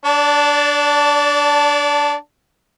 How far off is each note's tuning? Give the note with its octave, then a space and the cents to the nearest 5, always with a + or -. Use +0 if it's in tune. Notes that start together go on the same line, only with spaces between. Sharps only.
D4 +0 D5 -30 A5 +0